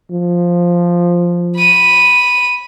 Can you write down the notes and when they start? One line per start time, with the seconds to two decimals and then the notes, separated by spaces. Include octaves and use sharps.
0.11 F3
1.57 B5 D#7